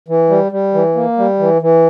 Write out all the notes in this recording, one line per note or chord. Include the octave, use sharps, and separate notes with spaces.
E3
G3
G3
E3
A#3
G3
E3
E3